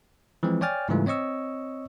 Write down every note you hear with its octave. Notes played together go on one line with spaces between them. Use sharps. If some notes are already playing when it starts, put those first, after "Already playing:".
E3 F3 G#3 C4
C#5 D5 G5 G#5 F6 A6
G#2 C#3 E3 G3 A3 F4
C4 C#5 D#5 C#6 E6